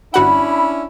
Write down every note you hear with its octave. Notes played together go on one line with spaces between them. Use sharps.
G1 C#4 D4 E4 F#4 F#5 B5